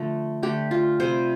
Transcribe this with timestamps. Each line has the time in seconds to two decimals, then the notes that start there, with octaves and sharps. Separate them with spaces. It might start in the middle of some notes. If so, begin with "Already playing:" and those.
Already playing: D3 F3 A3
0.43 D3 A3 G4
0.71 F4
1.00 C3 G3 C5